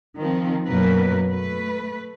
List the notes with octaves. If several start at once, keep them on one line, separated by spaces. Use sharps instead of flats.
D#3 F3 C4
F#2 B2 F#3 A#3 A#4 B4
A3 B4